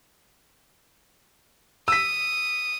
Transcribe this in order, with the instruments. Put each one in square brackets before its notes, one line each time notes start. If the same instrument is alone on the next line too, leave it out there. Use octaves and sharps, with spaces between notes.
[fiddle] D#6 [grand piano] E6 B6